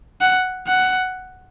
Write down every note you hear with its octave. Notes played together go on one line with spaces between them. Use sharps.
F#5
F#5